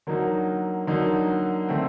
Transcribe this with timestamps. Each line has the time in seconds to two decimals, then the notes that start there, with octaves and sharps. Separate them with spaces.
0.07 D3 F#3 A#3 D#4
0.87 D3 F#3 A#3 D#4
1.69 D3 A3 C4